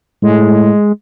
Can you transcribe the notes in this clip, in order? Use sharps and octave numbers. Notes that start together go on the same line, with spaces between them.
A2 G#3